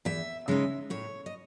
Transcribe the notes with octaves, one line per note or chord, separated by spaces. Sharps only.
E2 E5
C#3 G#3 D#4 E5
A2 C#5
D#5